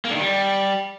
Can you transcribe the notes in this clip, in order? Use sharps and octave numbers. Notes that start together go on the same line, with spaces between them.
A#3
D3
D#3
G3